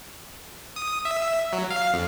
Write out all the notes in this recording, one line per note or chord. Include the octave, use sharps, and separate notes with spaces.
D#6
E5
F#3
F5
F2